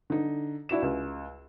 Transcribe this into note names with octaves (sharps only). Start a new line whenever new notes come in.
D3 D#4
D4 E4 F#4 E7
C#2